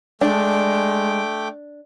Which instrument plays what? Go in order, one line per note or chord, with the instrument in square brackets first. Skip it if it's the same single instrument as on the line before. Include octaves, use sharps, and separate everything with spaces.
[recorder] G#3 [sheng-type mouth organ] A3 G5 D6 [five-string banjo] D4